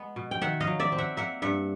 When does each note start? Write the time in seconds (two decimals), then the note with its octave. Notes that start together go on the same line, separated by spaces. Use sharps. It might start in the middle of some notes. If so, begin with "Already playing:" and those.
Already playing: G#3 B3
0.16 B2
0.31 G5
0.41 D#3 E5 F#5
0.60 D#5 F5
0.67 F#3
0.80 D5 E5
0.92 C4
0.98 E5 F#5
1.17 A#3 E5 F#5
1.42 G2 E5 F#5